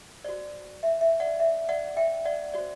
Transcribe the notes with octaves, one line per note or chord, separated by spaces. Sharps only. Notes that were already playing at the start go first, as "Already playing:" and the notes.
F#4 C5 D5
E5
E5
D5 F#5
E5
D5 F#5
E5 G5
D5 F#5
F#4 C5 D5